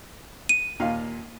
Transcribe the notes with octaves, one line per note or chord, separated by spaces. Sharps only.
D#7
D#2 A#2 F5